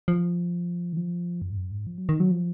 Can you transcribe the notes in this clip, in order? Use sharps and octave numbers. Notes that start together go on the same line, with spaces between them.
F3
D#3
F3
F#2
G#2
F#2
G#2
F3
F#3
D#3
F#3
F3